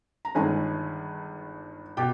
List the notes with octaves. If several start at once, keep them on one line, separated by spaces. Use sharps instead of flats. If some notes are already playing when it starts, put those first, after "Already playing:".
A#5
G1 G2 D#3 G#3 G#4 G#5
B2 G4 G5